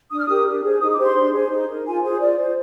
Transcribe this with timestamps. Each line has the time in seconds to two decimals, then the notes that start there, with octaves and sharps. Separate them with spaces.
0.11 D4 D#6
0.18 F6
0.26 G4 A#4 D#6
0.46 D4
0.63 G#4 C5
0.81 D#4 D#6
0.93 D6
0.98 G4 C5
1.04 C6
1.16 D4
1.33 G#4 C5
1.50 D#4
1.68 A#4
1.85 F4 G#5
2.03 G#4 C5
2.20 F4 D5
2.38 C5